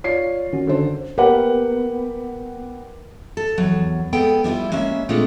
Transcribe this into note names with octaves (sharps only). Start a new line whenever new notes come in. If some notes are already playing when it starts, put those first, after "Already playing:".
F4 C#5 D5 C7
D#3 C#4 F#4
D3 A4 C5
B3 G4 A#4 B4 F#5
A4
E2 F#3
G#3 B3 A4 G5
G3 D4 E4 F4
G#3 A#3 C#4 E5
A#2 G#3 A3 C4 D4 F4